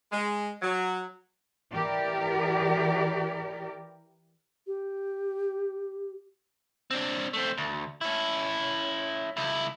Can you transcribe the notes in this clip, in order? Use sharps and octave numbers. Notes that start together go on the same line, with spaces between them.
G#3
F#3
E3 G4 A#4 D5
G4
C4 D4
A3 C4
D2
C#4 E4
C#2 E4